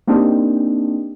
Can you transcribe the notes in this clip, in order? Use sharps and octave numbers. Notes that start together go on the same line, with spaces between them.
A#3 C4 D4 D#4 G4